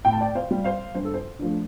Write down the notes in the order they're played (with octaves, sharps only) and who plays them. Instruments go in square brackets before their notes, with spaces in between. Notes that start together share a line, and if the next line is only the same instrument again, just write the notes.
[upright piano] A2 G5
A5
D5 G5
C5 F5
G3
C5 F5
G2 C5
A4
C5
D3 F3 A3